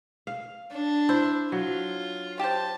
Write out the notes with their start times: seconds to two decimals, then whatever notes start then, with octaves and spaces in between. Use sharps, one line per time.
0.27 F5
0.71 D4
1.09 E4 C5
1.52 F#3 F4
2.39 G4 C5 A5